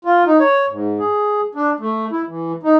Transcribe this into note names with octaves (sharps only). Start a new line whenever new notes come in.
F4
D#4
C#5
G#2
G#4
D4
A3
E4
E3
D#4